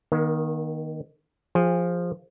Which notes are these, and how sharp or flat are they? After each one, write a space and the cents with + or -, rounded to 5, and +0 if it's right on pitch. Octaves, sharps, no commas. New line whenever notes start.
D#3 +0 A#3 +40
F3 +0 G#4 -25